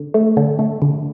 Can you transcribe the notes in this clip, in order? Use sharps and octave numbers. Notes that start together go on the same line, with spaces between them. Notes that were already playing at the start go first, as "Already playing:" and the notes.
Already playing: D3
A3
D3
A3
D3